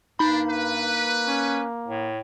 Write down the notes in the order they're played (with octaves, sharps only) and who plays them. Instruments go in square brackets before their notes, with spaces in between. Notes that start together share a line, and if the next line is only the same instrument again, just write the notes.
[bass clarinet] G2 [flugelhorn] A#3 [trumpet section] D4 [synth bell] D#4 B5
[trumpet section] B4
[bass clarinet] C#4
A2